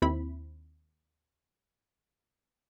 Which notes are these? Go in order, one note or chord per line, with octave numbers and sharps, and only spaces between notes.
D#2 C4 E4 B5